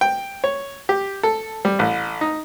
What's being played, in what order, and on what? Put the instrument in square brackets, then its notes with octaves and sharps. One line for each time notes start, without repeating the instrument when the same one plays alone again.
[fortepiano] G5
C#5
G4
A4
G3
A1
D#4